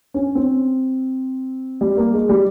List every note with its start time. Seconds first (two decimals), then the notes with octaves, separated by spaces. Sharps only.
0.14 C#4
0.35 C4
1.81 G3
1.97 A#3
2.14 G#3
2.29 G3